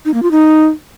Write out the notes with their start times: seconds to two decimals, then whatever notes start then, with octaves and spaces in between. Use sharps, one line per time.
0.05 D#4
0.14 A#3
0.23 F4
0.31 D#4